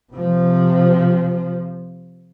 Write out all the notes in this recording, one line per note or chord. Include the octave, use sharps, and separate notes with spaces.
C3 F3